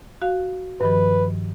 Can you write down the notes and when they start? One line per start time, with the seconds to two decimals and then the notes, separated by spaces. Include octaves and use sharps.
0.22 F#4 F5
0.81 G2 D#3 F3 B4